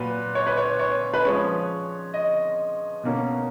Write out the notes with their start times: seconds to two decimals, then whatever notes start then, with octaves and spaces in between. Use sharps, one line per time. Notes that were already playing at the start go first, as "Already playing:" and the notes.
Already playing: A#2 F#3 B4
0.35 C#5
0.46 B4
0.57 C#5
0.79 C#5
1.13 B4
1.25 F3 G#3 C#4 C#5
2.14 D#5
3.03 B2 A#3 C#4